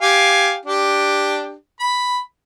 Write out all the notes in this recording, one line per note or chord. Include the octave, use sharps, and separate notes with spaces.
G4 F5 G#5
D4 G4
B5